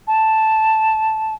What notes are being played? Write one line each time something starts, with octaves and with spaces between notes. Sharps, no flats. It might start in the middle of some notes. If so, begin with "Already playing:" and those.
A5